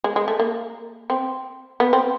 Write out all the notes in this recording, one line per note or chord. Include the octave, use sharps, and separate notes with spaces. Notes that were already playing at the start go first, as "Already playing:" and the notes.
G#3
G#3
A3
A#3
C4
B3
C4